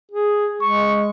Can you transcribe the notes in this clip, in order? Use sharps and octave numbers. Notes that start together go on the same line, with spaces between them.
G#4
G#3 C#6